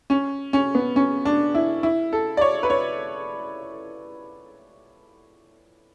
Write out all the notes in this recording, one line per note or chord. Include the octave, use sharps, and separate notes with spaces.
C#4
C#4
B3
C#4
D4
E4
E4
A4
D5
C#5
B4
C#5